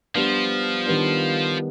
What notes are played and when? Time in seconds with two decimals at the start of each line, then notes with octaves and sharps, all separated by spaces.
0.15 F3 G3 B3 D4
0.86 D#3 G3 B3 D4